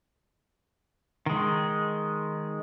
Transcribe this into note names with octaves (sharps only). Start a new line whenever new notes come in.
D#3 G#3